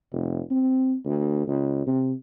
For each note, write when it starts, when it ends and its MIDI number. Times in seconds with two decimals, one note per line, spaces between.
0.13 0.40 29
0.51 0.96 60
1.05 1.44 38
1.47 1.84 37
1.86 2.13 48